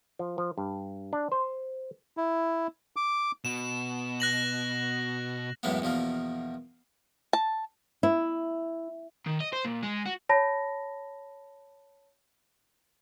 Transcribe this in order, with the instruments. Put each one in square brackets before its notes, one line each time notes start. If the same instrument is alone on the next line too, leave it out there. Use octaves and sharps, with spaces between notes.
[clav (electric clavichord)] F3
F3
G2
D4
C5
[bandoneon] E4
D6
[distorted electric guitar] B2 [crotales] E7
[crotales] F#6 A#6 F#7
[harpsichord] F#2 A2 E3 G#3 A#3 B3
E2 B2 F3 A#3
[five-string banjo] A5
[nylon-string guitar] E4
[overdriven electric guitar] D#3
D#5
C5
A#2
G#3
F#4
[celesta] C#5 A5 B5 A#6